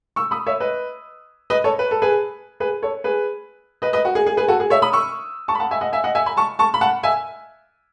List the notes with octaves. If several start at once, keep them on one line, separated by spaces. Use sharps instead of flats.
C#6 E6
B5 D#6
C#5 E5
B4 D#5
B4 D#5
A4 C#5
B4
A4
G#4 B4
G#4 B4
A4 C#5
G#4 B4
B4 D#5
B4 D#5
F#4
G#4
G#4
G#4 B4
F#4 A4
G#4
C#5 E5
B5 D#6
C#6 E6
A5 C#6
B5
F#5 A5
E5 G#5
D#5 F#5
E5 G#5
D#5 F#5
E5 G#5
G#5 B5
A5 C#6
A5 C#6
B5
F#5 A5
E5 G#5